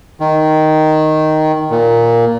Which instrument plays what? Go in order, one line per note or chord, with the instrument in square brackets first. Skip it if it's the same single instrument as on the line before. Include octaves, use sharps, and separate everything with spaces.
[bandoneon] D#3
A#2